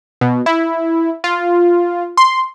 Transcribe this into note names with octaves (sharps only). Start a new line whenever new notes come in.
B2
E4
F4
C6